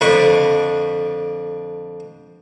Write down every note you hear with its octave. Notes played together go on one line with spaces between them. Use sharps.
F2 D3 D4 B5 C#6